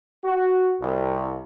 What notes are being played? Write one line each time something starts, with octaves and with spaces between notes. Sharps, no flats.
F#4
C2